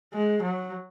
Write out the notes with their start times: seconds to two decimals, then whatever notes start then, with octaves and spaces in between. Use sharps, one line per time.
0.14 G#3
0.42 F#3